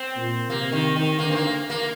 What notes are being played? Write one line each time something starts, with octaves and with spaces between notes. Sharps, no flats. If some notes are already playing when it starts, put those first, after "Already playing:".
Already playing: C4
A#2
C3 A#3
D#3
D#3
D3 A#3
C4
A#3
A#3